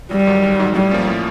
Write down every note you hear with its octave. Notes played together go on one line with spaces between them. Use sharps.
G#1 G3
G#2 D#3 F#3
G#1
G#2 D#3 F#3
A2 G3
F3 A#3 C#4 F4
A2